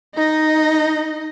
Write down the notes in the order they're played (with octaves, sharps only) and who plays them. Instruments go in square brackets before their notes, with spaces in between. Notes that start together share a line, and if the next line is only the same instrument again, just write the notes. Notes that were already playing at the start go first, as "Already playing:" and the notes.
[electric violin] D#4 D#5